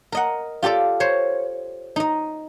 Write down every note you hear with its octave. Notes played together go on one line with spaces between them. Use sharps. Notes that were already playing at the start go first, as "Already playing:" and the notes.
A#4 D#5 F#5
F4 G4 A4 D5
C5 C#5
D#4 D#5